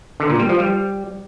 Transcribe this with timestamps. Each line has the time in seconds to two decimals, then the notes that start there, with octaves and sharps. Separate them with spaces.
0.20 D3
0.30 A#2
0.39 G3
0.49 F3
0.59 G3